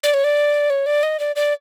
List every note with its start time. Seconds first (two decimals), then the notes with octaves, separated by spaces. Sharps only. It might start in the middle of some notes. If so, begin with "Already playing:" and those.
0.03 D5
0.14 C#5
0.24 D5
0.70 C#5
0.86 D5
1.03 D#5
1.20 D5
1.36 D5